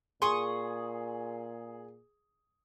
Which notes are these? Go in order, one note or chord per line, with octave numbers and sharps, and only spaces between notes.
A#2 G#4 C6 C#6 D#6